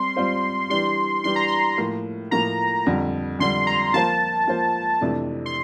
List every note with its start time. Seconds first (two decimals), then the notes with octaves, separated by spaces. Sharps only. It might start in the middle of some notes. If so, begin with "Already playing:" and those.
Already playing: G3 C4 C6
0.16 G3 C4 F4 C5
0.70 E3 G3 D4 G4 C6
1.24 E3 G3 D4 G4 C6
1.36 A#5
1.48 C6
1.78 A2 F3 A#3
2.31 A2 F3 A#3 A#5
2.86 F2 D3 G3
3.39 F2 D3 G3 C6
3.67 A#5
3.94 F3 A#3 F4 C5 A5
4.48 F3 A#3 F4 C5
5.01 F2 C3 E3 A3 D4
5.46 C6